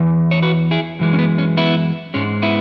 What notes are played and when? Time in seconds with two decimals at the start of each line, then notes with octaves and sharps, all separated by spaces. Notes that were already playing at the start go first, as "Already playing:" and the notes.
Already playing: E2 E3
0.31 C#5
0.42 F#4 B4
0.71 E4 G#4
0.99 F#2 E3 G#3
1.13 C#4
1.19 B3
1.38 C#4
1.57 B3 E4
2.14 G#2 G#3 C#4
2.42 B3 E4